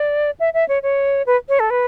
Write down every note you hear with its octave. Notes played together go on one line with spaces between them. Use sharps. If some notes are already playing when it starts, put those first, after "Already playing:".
Already playing: D5
E5
E5
C#5
C#5
B4
C#5
A4
B4